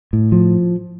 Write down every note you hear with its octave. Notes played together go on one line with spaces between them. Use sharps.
A2
F3